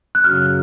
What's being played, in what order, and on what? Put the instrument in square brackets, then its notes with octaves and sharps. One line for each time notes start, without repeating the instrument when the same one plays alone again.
[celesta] F#6
[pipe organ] F#2 C#3 F#3 [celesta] F6